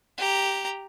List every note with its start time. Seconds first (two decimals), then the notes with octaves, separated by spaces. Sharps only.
0.18 G4 A#5